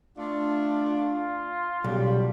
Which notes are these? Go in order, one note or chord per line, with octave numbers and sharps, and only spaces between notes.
A3 D4 F4
F4
B1 C#3 F#3 G3